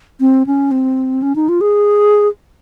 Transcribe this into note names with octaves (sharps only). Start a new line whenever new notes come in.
C4
C#4
C4
C#4
D#4
F4
G#4